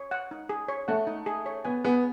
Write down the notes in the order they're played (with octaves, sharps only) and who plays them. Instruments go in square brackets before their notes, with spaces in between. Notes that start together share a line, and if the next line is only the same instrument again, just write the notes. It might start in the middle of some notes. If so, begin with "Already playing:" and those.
Already playing: [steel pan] C#5
F#5
D#4
G#4
C#5
[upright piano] A3 [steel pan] F#5
[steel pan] D#4
G#4
C#5
[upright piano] B3 [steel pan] G#5
[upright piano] B3 [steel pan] G#4